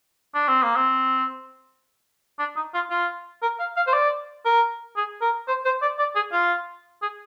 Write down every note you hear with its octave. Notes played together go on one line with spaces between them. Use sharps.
D4
C4
A#3
C4
D4
D#4
F4
F4
A#4
F5
F5
C5
D5
A#4
G#4
A#4
C5
C5
D5
D5
G#4
F4
G#4